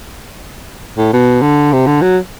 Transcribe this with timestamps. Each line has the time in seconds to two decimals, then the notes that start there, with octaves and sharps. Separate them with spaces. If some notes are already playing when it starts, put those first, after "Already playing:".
0.98 A2
1.13 B2
1.42 D3
1.73 C3
1.87 D3
2.02 F#3